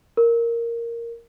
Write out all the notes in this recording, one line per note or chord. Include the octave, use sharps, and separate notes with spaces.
A#4